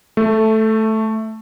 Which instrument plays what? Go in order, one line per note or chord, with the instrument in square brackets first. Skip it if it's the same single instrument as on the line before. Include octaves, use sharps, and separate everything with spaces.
[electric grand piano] A3